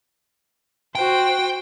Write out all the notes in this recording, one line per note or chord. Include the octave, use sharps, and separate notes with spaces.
F#4 C5 G5